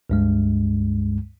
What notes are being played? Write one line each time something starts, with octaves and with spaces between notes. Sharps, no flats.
C#2 G2 G#3